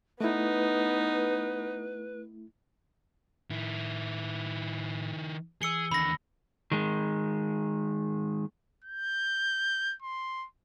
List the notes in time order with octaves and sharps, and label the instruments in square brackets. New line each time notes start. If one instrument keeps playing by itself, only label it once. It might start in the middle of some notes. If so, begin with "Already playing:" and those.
[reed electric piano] A3 E4 [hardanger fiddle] B3 D#4 [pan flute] B4
[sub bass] A2 [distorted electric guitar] D#3 E4
[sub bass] E3 [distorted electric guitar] G#4 [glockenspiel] E6 C#7 G7
[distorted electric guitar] D#2 D3 [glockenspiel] B5 A#6
[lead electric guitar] D#3 G#3
[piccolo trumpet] G6
C6